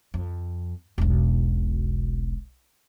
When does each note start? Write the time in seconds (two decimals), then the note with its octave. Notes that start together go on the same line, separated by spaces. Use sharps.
0.14 F2
0.98 E1 B1